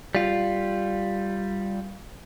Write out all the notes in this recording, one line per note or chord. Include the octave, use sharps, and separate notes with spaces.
G3 F4